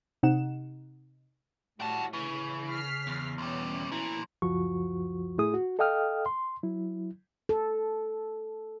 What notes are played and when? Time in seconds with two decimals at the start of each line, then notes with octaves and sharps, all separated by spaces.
0.23 C3 D#4 F#5 E7
1.80 A2 G3 F#4 G5 A5
2.13 C#3 E3
2.69 F6 B6 C7
3.07 E2
3.38 D2 B2 G3 C#4
3.92 E3 F3 A#3
4.42 C#2 F#2 F3 F4 F#4 C#6
5.38 A2 A3 E4 G#4 D#6
5.54 F#4
5.79 A4 D#5 F5 G5 D#6 F6
6.26 C6
6.63 F#3 E4
7.49 A4